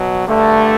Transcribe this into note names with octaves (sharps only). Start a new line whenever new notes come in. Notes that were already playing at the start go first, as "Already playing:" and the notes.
Already playing: B2 F#3
G2 D3 A3